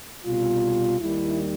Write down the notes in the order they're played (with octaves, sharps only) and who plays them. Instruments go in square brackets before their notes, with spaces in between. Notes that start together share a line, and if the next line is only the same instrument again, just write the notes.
[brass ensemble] C2 B2 G3 F4
D#2 D#3 G3 E4